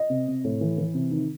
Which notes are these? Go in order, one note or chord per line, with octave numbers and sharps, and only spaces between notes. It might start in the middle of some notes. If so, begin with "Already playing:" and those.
Already playing: D#5
C3
C3
A2
E3
E3
C3
D#3